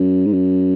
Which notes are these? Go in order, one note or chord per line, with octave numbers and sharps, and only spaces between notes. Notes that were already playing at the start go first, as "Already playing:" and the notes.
Already playing: F#2
G#2
F#2